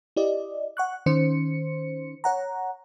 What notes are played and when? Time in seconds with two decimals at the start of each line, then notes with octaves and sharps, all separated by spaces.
0.16 E4 G4 D5 D#5
0.77 F#5 C#6 F#6
1.06 D#3 C#4 C5 C#7
2.24 C#5 F#5 A#5